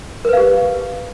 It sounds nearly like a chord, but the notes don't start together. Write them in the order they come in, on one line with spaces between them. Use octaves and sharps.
A#4 B4 F5 G4